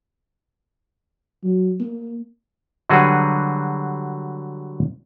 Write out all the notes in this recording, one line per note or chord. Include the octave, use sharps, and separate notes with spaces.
F#3
A#3
D3 F#3 G3 F#4 G#4 B4